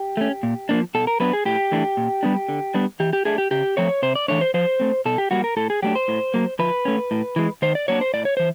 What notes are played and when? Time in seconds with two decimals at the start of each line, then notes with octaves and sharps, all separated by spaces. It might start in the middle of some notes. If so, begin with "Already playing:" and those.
Already playing: G4
0.17 A3 C#4
0.43 A#2
0.69 F3 A#3 D4
0.95 B2 A4
1.07 A#4
1.20 F#3 B3 D4 B4
1.33 G#4
1.45 A2 G4
1.72 E3 A3 D4
1.97 A#2
2.23 G3 B3 D4
2.49 D3
2.74 G3 B3 D4
3.00 E3 G4
3.13 G4
3.25 A3 D4 G#4
3.38 G4
3.51 C#3 G4
3.77 F3 A3 C4 C#5
4.03 C3 C5
4.15 D5
4.28 E3 A3 D4 C#5
4.41 C5
4.54 F3 C5
4.80 A3 C4
5.05 B2 A4
5.18 G4
5.31 G3 A#3 F#4
5.44 A#4
5.57 A2 A4
5.70 G#4
5.82 F#3 A3 D4 G4
5.95 C5
6.08 A2
6.34 F#3 A#3
6.59 F3 B4
6.85 A3 C#4
7.11 A2
7.36 E3 G#3
7.62 D#3 C5
7.75 D5
7.88 F#3 A#3 D4 C#5
8.01 C5
8.14 A2 D5
8.25 C#5
8.37 E3 C5